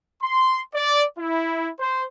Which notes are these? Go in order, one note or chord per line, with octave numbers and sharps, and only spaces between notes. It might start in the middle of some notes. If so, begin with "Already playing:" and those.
C6
D5
E4
C5